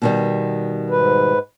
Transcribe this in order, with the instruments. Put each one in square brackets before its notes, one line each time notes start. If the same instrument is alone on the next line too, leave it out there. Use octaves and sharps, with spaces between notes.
[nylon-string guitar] B2 D#3 G3
[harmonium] G#2 B4